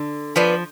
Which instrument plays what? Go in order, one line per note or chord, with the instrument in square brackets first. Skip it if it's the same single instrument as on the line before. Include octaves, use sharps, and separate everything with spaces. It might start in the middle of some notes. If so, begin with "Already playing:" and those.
Already playing: [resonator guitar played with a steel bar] D3
[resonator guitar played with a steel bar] F3 [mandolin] B3 F4 B4 D5